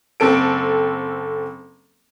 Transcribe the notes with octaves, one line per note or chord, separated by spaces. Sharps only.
F#1 C4 A4 D7